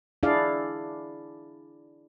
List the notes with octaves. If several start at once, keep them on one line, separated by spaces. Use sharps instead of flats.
D4 E4 G#4 D5 F5